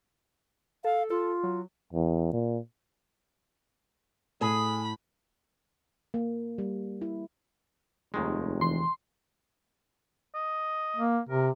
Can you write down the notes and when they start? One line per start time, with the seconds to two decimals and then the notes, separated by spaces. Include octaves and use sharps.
0.84 A4 F5
1.10 F4 A4
1.43 F#3
1.93 E2
2.33 A#2
4.41 A2 G#4 B5
6.14 A#3
6.58 G3
7.02 E4
8.14 F1 D#2 D#3 G#3
8.61 E3 C6
10.35 D#5
10.97 A#3
11.29 C3 A#4